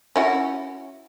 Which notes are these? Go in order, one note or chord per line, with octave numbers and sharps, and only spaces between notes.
C#4 E4 F#4